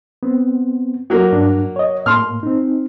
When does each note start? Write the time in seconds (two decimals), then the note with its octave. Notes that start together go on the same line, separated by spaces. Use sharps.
0.23 B3 C4
1.10 F#3 A#3
1.32 G2 D4
1.76 C#5 D#5
2.06 A2 A#3 C6 F6
2.43 C4 D#4